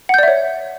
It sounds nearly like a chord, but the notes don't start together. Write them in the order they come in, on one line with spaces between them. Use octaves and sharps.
F#5 G6 D5 E5 C#5